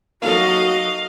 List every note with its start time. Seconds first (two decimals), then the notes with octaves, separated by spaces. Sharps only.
0.22 F#3 A#3 D#4 F#4 A4 D#5 F5